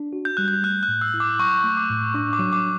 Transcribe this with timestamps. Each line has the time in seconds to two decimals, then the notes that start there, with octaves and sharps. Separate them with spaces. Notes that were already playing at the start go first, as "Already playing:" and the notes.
Already playing: D4
0.13 F#4
0.25 G6
0.37 G3 F#6
0.48 G6
0.63 A3 F#6
0.83 F#6
0.88 A2
1.01 E6
1.14 E4
1.20 D6
1.39 F#3 C#6
1.64 A3
1.77 D6
1.90 A2
2.14 D4 C#6
2.33 D6
2.39 F#3
2.53 D6